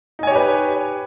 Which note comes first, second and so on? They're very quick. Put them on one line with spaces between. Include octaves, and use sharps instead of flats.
D#4 G#5 C#5 G4 B4